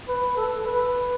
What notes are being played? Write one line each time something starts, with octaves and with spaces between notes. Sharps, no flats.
B4
A4
B4